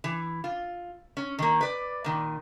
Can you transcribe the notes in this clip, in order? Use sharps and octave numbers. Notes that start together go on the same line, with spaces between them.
E3
F4
C#4
D#3 A#3
B4 D5
A#2 D#3